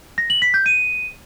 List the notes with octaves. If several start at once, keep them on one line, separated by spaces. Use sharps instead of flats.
A#6
F#7
B6
G6
D#7